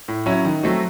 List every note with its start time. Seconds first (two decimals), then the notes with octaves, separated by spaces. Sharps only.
0.08 A2
0.26 F#3 C#4 E4
0.45 D#3
0.63 F#3 A3 C4 F#4